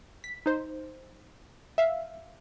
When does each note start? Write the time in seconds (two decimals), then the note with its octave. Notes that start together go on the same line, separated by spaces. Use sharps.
0.24 B6
0.46 D#4 C5
1.78 E5 F5